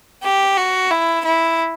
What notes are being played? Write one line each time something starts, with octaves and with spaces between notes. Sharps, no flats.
G4
F#4
E4
E4